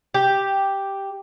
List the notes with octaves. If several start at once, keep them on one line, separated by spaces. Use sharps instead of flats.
G4